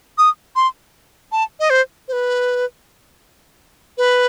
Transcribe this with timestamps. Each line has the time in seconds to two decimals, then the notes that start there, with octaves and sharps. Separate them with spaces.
0.18 D#6
0.56 C6
1.32 A5
1.60 D#5
1.70 C5
2.08 C5
2.13 B4
3.98 B4